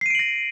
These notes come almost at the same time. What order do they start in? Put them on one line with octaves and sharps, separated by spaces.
C7 D#7 D7 F#7 A#6